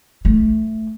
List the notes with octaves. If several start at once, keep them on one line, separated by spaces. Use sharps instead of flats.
A3